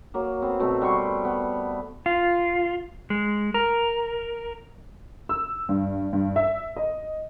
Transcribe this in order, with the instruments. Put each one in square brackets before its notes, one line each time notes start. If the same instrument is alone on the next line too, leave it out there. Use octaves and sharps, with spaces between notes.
[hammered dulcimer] F#3 A#3
B3 C4
B2 A3 C4
G3 B3 C6 C#6
B3
[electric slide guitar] F4
G#3
A#4
[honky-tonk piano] E6
G2
G2
E5
D#5